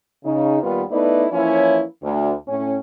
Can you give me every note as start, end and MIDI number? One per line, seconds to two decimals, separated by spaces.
0.25 0.61 49
0.25 0.61 63
0.62 0.82 39
0.62 0.82 51
0.62 0.82 55
0.62 0.82 59
0.62 0.82 65
0.62 0.82 71
0.91 1.27 57
0.91 1.27 59
0.91 1.27 63
0.91 1.27 64
0.91 1.27 71
0.91 1.27 74
1.31 1.82 52
1.31 1.82 53
1.31 1.82 58
1.31 1.82 61
1.31 1.82 64
1.31 1.82 73
2.03 2.32 38
2.47 2.76 45
2.47 2.76 61